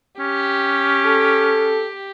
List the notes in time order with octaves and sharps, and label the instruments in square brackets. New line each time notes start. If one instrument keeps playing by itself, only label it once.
[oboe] C#4 [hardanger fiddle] G4
[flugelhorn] A4